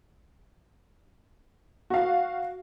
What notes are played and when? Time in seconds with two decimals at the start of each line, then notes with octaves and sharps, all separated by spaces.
1.90 F#4 F5